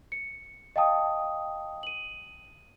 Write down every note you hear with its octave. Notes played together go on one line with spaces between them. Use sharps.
C#7
D#5 F5 G5 A5 D#6
D#7 F#7